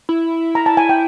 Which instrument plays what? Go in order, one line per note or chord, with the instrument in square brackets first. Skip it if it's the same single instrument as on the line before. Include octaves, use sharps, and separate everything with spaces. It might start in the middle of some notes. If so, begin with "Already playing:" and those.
[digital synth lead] E4
[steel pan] A#5
A5
G#5
G5